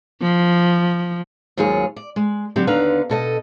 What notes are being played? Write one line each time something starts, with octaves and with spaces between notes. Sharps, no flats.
F3
D#2 G#2 F#3 F4 G#4 C#5
D5
G#3
D3 F#3 B3 C4 G4 B4
D#2 D3 B3 B4 F5 A#5
B2 A4 D#5